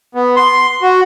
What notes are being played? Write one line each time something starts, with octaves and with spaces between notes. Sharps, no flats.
B3
C6
F#4